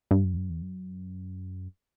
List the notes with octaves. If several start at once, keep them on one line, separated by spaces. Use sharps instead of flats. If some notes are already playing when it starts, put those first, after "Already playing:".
G2
F#2
E2
F#2
E2
F#2